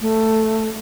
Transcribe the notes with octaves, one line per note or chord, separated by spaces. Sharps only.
A3